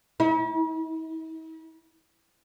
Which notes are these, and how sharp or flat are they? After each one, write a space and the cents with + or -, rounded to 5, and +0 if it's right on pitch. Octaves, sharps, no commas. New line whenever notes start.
E4 -45